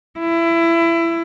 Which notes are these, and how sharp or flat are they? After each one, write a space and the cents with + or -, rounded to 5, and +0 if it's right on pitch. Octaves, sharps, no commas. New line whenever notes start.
E4 +25